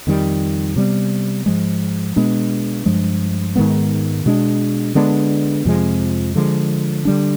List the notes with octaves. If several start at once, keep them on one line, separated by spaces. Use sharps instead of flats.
F2 D#3 G3
C3 G3 B3
G#2 F3 G#3
B2 G#3 B3 D4
G2 F3 G#3
G#2 D#3 G#3 B3
B2 G#3 D4
D3 G#3 B3 D4
F2 C3 F3 G#3
D3 F3 G#3
D3 G3 D4